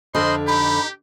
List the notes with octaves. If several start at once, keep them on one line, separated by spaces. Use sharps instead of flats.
F2 D3 A#4 C5 D#5 B5 C6
D#4 G4 B5